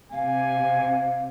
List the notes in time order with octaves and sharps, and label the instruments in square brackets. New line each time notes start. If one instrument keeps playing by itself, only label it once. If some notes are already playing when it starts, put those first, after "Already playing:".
[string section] C3 [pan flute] F5 [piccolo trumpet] G#5